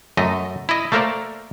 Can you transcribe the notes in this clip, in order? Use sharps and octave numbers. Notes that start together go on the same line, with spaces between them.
F#2 A3 D#5
E4 D#5
A3 A#3 A4 A#4 C5 D5